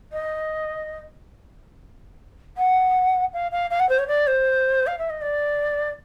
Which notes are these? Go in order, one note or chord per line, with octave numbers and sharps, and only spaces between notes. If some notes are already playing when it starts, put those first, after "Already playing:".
D#5
F#5
F5
F5
F5
F#5
C5
C#5
D5
C5
F5
E5
D#5
D5